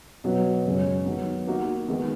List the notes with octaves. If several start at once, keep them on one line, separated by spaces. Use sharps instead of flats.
B2 F#3 B3 F#4 B4
F#2 C#3 G#3 C#4
D#3 F#3 B3
A#3 D#4 F#4
D#3 G#3 B3